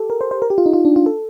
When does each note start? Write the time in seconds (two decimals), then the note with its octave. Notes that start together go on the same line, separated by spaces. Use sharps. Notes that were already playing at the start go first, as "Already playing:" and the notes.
Already playing: G4 A4
0.10 A#4
0.21 C5
0.31 C5
0.42 A#4
0.50 G4
0.58 F4
0.66 D#4
0.73 F4
0.85 D4
0.96 F4
1.06 A4